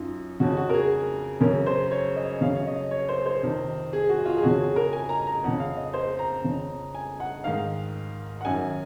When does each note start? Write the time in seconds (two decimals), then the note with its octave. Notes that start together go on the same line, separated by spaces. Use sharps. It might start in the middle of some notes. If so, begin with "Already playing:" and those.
Already playing: F#2 D#4 F4
0.40 F2 C#3 F#4
0.57 F#4
0.69 A#4
0.74 G#4
1.41 F#2 C#3 A#4
1.66 C5
1.91 C#5
2.16 D#5
2.41 F#2 C#3 F5
2.56 C#5
2.67 D#5
2.91 C#5
3.09 C5
3.26 C5
3.42 F2 C3 D#3
3.93 G#4
4.09 F#4
4.25 F4
4.37 G#4
4.42 F2 C#3 F#4
4.60 G#4
4.76 A#4
4.93 G#5
5.09 A#5
5.27 A#5
5.44 F2 C#3 F#5
5.60 F5
5.77 D#5
5.94 C5
6.19 A#5
6.44 F2 C#3
6.94 G#5
7.20 F#5
7.44 G#2 D#3 F5
8.41 F#5
8.45 F#2 D#3 G#5